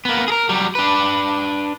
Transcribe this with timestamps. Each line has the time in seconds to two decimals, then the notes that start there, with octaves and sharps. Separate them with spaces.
0.05 A#3 B3
0.28 G#4 A#4
0.49 F#3 G3
0.75 D4 B4